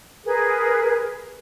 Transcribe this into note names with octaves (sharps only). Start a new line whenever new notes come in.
G#4 A#4 B4